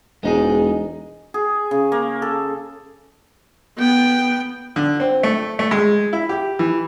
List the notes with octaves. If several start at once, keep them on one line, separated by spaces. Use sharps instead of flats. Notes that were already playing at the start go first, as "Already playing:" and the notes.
E1 G#3 D#4 G#4
G#4
C#3
A#3
A4
B3 G5
D3
C4
A3
A3
G#3
E4
G4
E3